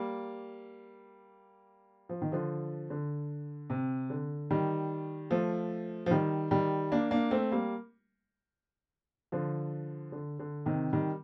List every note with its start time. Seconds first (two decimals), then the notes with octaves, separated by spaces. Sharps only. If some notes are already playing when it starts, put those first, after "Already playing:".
Already playing: G3 A#3
2.09 F3
2.22 D#3
2.32 D3 F3
2.90 D3
3.70 C3
4.10 D3
4.50 D#3 G3
5.31 F3 A3
6.06 F3
6.11 D#3 G3
6.51 D#3 G3
6.92 A#3 D4
7.11 A#3 D4
7.31 A3 C4
7.52 G3 A#3
9.32 D3 F3
10.12 D3
10.39 D3
10.66 C3 D#3
10.92 D#3 G3